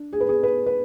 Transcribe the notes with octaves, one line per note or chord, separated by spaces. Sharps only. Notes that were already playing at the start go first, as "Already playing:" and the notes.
Already playing: D4
G#4
B4
G#4
B4
B4